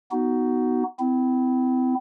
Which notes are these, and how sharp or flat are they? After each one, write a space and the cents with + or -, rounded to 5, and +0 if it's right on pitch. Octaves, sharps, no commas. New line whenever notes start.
B3 +0 D#4 +5 F#4 +15
C4 -35 E4 +0